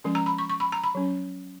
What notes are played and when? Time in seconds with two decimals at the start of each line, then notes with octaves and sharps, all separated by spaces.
0.04 F3 G#3 C#4
0.15 A#5
0.26 B5
0.39 C#6
0.50 C#6
0.60 B5
0.72 A#5
0.84 B5
0.95 F#3 C#4